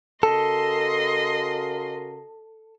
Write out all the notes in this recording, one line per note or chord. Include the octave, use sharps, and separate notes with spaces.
C#3 F#4 A4 A#4 D#5 C6